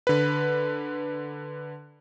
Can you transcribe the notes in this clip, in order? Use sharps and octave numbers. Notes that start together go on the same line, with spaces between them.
D3 B4